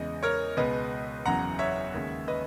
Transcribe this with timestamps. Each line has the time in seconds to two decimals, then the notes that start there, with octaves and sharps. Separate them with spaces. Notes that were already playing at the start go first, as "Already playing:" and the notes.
Already playing: E2 C#3 G#3 D#5
0.23 A#4 C#5
0.57 C#2 B2 G#3 B4 D#5
1.25 F#1 E2 C#3 F#3 F#5 A#5
1.59 C#5 E5
1.94 D#2 C#3 G#3
2.28 B4 D#5